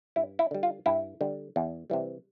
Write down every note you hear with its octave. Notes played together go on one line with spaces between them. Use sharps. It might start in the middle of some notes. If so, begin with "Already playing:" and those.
G2 E4
E4
D3 G3
F4
G2 E4
D3 G3
E2
C3 E3 G3